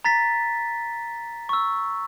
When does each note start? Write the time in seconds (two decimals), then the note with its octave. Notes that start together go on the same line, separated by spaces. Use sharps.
0.04 A#5 A6 B6
1.49 C#6 E6